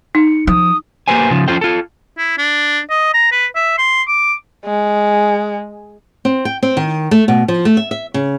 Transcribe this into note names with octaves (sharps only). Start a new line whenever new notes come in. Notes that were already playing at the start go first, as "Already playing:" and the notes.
D#4 C#7
F3 D#6
A#3 G4 B4 C5 G#5
C#3 F3
F3 C#4 F4 A4 C5 G5
F4 A4
E4
D4
D#5
A#5
B4
E5
C6
D6
G#3
C4
G5
C4
D#3
A3
B2
F3
A3
E5
E5
C#3